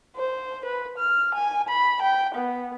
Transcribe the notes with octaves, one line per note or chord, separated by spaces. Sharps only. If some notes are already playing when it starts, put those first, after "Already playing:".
C5
B4
F6
G#5
B5
G5
B3